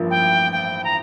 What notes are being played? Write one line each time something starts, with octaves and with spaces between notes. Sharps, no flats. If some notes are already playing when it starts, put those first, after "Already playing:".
Already playing: A1 G2 F3 A#3
G5
G5
A#5